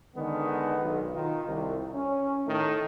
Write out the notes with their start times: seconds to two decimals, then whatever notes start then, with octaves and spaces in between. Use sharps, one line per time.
0.16 D3 D#3 G#3 B3
0.82 B1
1.14 D#3 F4
1.46 C2
1.94 C#4
2.47 A2 D#3 A3